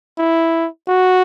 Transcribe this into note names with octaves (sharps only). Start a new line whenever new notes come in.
E4
F#4